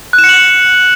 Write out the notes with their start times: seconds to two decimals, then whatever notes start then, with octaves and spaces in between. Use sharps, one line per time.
0.13 F#6
0.18 E7
0.24 C#7
0.29 F#7
0.34 C#7